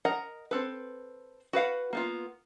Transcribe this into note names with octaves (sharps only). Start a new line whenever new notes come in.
A#4 D#5 F#5 A#5
C4 A4 B4
F#4 B4 F5 F#5
A#3 B3 F4